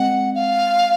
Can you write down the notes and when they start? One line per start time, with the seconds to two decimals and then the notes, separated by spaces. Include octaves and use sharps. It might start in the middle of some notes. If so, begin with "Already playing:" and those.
Already playing: G#3 C4 F#5
0.35 F5